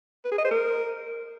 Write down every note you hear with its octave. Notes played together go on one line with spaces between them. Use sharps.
B4
G#4
D#5
C5
A#4